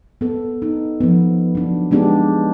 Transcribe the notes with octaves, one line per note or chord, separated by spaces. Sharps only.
B3 A4
D#4
F3 B3
F#3 D4
G#3 B3 D4 D#4 G4 G#4